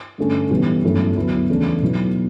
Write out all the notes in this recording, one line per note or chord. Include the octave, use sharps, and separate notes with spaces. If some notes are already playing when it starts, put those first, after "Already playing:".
G2 D3 A3 C#4
B1 A2 E3 G3 B3
G1 F#2 D3 A3 E4
D2 D3 F#3 B3 E4
E2 C#3 E3 A3 D4
B1 B2 F#3 B3 E4